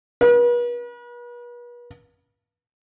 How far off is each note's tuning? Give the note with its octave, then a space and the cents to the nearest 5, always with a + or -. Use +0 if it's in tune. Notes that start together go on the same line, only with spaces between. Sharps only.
B4 -40